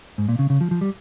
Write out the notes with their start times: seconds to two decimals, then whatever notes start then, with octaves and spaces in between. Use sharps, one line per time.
0.18 G#2
0.29 A#2
0.39 C#3
0.50 C#3
0.61 F3
0.71 F3
0.81 G3